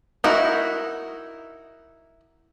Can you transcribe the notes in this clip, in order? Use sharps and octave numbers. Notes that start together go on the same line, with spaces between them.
D#4 E4 F#4 A#4